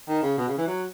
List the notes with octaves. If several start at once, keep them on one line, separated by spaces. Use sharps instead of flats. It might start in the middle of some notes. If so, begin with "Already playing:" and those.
D#3
C#3
B2
C#3
E3
F#3